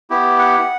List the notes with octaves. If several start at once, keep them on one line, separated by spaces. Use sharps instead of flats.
B3 E4 G4
F#5